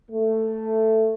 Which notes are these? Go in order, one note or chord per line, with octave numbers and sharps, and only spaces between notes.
A3